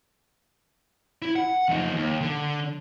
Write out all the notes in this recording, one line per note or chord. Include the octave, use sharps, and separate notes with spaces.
E4
F#5
F2 D#4
D#2
D3